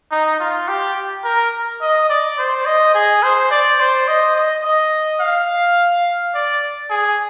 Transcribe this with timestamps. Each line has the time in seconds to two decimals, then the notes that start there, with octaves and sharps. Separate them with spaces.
0.11 D#4
0.40 F4
0.68 G4
1.24 A#4
1.82 D#5
2.10 D5
2.38 C5
2.66 D#5
2.95 G#4
3.23 C5
3.51 D5
3.80 C5
4.08 D#5
4.36 D#5
4.64 D#5
5.20 F5
6.34 D5
6.90 G#4